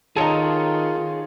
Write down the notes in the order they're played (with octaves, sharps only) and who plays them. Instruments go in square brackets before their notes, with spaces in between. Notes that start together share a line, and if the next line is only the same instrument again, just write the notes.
[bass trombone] D#3 [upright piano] D#4 A4 [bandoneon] F4 [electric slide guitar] G#4 C#5